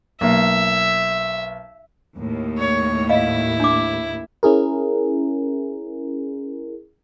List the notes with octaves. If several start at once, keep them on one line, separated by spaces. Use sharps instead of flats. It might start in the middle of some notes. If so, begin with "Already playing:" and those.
B1 A#3 E5
D#2 A2
C#5
E4 D#5 F5
D4 D6
C#4 E4 G#4 A#4